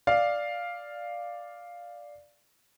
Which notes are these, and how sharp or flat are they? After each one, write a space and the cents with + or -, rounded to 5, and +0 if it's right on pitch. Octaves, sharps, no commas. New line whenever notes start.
D5 +0 F5 +0